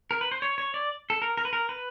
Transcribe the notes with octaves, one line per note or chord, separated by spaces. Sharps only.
A#4
B4
C5
C#5
C#5
D5
A4
A#4
A#4
B4
A#4
B4